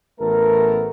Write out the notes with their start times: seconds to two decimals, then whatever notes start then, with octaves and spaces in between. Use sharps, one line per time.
0.20 A1 A3 B3 A4 A#4